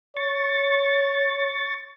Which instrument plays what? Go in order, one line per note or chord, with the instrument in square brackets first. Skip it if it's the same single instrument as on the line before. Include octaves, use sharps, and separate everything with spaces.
[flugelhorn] C#5 [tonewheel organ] C#6 A6